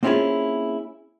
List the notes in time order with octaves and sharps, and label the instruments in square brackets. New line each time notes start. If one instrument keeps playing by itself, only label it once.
[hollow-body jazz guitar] A#3 C4 C#4 E4 F4 G#4